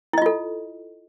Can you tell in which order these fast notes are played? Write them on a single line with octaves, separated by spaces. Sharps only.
E4 D#5 F4 A4